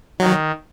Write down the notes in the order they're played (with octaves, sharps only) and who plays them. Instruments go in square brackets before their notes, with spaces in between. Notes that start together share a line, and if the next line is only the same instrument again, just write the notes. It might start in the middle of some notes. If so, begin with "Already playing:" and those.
[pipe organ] D#3 [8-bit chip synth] F#3